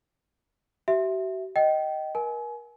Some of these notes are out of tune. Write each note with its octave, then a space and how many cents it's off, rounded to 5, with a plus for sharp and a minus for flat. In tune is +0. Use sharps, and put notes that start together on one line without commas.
F#4 +45 E5 +0
D#5 +0 G5 -25
A#4 +35 G#5 +30